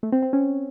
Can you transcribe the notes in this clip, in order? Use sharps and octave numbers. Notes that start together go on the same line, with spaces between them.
A3
C4
C4
C#4